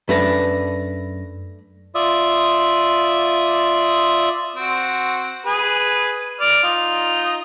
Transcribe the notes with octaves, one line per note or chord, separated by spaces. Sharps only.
F#2 A3 D4 B4 A#6
F4 D5 E5 D#6
C4 F#4
G#4 B4
D5 D6 F6
D#4 F4